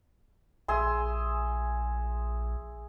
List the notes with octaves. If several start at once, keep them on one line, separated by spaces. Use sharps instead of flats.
A#1 G#4 E5 C6